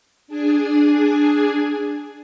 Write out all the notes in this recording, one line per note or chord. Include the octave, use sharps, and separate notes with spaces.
D4 G#4 G#5